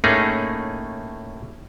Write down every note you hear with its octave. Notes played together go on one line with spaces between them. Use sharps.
A2 A3 A#3 C#4 D#4 G#4